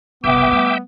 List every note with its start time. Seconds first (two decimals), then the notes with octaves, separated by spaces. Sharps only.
0.24 F#1 C2 B3 E5 G5 D6
0.48 G3 A3